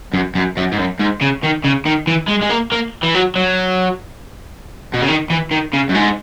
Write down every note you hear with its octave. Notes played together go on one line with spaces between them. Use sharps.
F#2
F#2
F#2
G#2
F#2
G#2
C#3
D#3
C#3
D#3
E3
G#3
G#3
A#3
A#3
E3
F#3
F#3
B2
C#3
D#3
E3
D#3
C#3
F#2
G#2